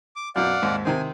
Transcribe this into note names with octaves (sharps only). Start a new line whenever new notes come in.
D6
F#2 B2 D5 F5 F#5
D#2 G#2
C3 D#3 C4 G#5